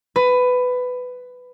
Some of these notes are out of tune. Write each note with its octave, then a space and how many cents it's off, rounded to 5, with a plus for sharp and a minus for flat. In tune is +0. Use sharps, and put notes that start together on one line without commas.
B4 +15